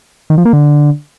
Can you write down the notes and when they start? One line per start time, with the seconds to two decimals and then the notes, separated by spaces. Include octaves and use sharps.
0.30 D#3
0.38 F3
0.45 A#3
0.53 D3